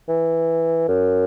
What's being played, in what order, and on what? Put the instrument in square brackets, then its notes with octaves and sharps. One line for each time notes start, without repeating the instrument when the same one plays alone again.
[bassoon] E3
F#2